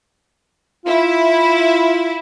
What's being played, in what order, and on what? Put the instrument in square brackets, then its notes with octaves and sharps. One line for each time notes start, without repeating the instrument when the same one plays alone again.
[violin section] E4 [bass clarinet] F4